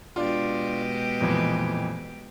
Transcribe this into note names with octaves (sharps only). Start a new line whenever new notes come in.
B2 G#3 D4 F4 G4
F2 A#2 E3